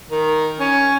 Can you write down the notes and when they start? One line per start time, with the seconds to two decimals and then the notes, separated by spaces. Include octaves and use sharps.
0.10 D#3
0.59 C#4